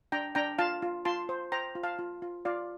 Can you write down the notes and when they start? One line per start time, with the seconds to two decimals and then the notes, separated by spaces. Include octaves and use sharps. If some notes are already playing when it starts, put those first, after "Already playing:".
0.12 D4 G5 A#5
0.35 D4 G5 A#5
0.58 F4 F5 A5
0.82 F4
1.05 F4 A5 C6
1.29 C5
1.52 C5 G5 A#5
1.75 F4
1.83 F5 A5
1.99 F4
2.22 F4
2.45 F4 D5 F5